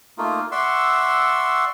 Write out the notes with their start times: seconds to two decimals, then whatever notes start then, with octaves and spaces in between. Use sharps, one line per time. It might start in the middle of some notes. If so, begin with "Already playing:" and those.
0.18 A3 A#3 D#4 F4
0.52 D5 E5 F#5 C6 C#6 E6